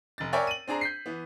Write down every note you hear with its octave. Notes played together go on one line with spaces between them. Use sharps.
F1 A6
A#4 C#5 D5 E5 G5 G#5
D#7 F#7
C4 D4 G#4 A#5
G6 B6 C7
E3 B3